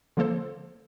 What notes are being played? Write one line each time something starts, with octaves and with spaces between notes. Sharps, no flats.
D3 F3 A#3 A4 C5